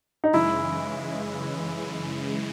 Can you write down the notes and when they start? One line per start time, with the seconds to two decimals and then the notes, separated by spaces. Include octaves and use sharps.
0.24 D#4
0.33 F#2 C#3 E3 G#3 E4